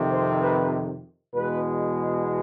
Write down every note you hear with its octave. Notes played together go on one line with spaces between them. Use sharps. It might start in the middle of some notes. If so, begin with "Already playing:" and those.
Already playing: F2 C3 D#3
C5
B4
E2 B2 G#3 B4